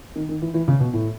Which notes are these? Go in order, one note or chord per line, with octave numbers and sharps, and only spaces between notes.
D#3
D#3
E3
E3
C#3
B2
A2